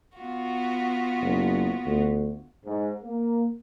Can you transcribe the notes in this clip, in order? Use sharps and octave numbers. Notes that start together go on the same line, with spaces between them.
B3 F4 F#4
F#1
D2
G#2
A#3